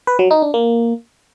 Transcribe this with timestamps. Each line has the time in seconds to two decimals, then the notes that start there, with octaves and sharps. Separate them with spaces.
0.07 B4
0.19 F#3
0.31 D#4
0.42 D4
0.54 A#3